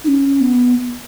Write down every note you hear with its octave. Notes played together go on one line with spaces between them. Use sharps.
D#4
C#4
B3